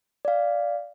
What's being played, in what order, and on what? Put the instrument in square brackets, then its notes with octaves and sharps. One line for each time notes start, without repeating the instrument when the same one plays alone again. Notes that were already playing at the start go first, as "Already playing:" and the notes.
[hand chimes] D5 F5